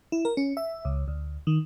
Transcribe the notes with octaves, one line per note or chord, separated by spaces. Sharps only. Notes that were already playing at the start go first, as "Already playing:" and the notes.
E4
A#4
C#4
E5
C#2
D2
D#3